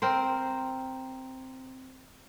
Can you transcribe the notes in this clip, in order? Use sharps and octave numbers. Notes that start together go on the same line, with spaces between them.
C4 A#4 C5